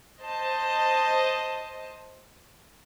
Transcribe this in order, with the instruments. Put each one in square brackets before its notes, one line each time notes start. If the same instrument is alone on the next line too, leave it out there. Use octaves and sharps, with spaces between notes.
[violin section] C5 D#5 A5